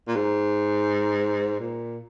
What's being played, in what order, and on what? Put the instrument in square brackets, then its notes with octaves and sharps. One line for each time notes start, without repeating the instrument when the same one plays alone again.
[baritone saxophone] A#2
G#2
A#2